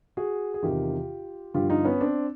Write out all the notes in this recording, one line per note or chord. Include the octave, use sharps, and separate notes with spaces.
F#4 G#4
G#4
E2 C3 D#3 F4 G4
G2 D3 F3 F4 G4
D#4 F4
B3 C#4
C4 D4